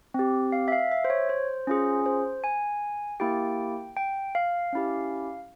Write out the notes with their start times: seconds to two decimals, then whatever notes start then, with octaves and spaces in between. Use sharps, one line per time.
0.14 C4 G4
0.52 F5
0.68 E5
0.72 F5
0.91 E5
1.05 C5
1.10 C#5
1.29 C5
1.67 C#4 F4 G#4
2.06 C5
2.44 G#5
3.20 A#3 E4 G4 G5
3.97 G5
4.35 F5
4.73 C#4 E4 G4